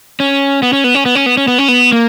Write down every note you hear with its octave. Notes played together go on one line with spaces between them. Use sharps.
C#4
B3
C#4
B3
C#4
B3
C#4
B3
C#4
B3
C#4
B3
A#3